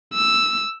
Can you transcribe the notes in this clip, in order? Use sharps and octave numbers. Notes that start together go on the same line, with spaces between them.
E6